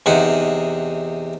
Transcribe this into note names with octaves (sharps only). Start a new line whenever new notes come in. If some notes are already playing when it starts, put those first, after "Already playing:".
E2 C3 D#4 F#5